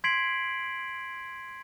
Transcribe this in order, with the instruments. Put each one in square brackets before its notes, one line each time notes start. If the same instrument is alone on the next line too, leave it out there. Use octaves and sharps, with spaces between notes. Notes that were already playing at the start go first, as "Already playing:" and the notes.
[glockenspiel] C6 G#6 B6 C7 D7 F#7